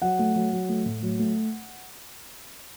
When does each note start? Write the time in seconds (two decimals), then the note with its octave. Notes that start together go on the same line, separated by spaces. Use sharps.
0.02 F#3 F#5
0.19 A3
0.36 F#3
0.53 F#3
0.69 A3
0.85 A2
1.03 F#3
1.19 A3